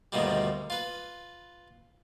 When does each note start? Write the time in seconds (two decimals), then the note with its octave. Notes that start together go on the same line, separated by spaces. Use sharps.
0.12 D2 G2 B2 D#3 F3 G3
0.70 F4 B4